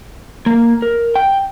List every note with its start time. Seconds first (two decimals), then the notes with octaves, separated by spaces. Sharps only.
0.46 A#3
0.82 A#4
1.16 G5